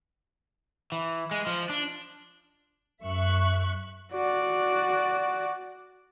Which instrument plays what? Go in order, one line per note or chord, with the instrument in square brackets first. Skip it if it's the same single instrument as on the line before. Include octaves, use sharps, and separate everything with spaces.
[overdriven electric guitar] E3
G#3
F3
D4
[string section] F#2 E5 C#6 F#6
[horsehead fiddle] F#4 D5